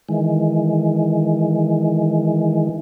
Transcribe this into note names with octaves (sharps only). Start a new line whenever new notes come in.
D#3 E3 G#3